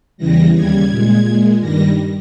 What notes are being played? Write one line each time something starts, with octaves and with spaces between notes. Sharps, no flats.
E2 C#3 E3 G3 A#6
D#2 C#3 G3 G#6
A#2 G#3
A#2 G#3
G2 D#3 G3 A#6